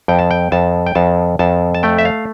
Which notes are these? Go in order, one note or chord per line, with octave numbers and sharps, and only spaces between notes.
F2 G5
A5
G5
F2 A5
G5
F2 A5
F2 A5
A5
A3 G5
E5
F5